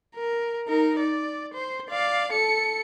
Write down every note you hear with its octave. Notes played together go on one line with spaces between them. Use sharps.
A#4
D#4 A#4
D5
C5
D5 F5
A4 C#7